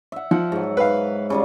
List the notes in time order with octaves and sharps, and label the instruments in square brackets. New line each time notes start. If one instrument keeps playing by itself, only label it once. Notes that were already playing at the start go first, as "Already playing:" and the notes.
[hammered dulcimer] E5 F#5
[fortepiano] F3 [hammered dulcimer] F#5
[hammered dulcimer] G#2 F#3
[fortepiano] B4 F5
[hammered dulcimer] C#3 G3 F4